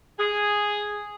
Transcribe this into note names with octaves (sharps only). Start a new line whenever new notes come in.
G#4